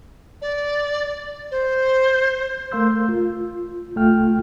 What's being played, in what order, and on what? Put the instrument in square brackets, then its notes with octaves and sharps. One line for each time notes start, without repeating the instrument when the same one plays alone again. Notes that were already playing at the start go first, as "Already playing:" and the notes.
[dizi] D5
C5
[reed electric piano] A3 A#4 F5 C6 E6 G6
F4
C2 A3 F4 G5 F6